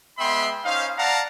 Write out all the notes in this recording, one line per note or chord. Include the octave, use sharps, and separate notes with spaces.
G#3 B3 E5 G5 B5 C6
C#4 D#4 C5 F5
D5 F5 F#5 A5 A#5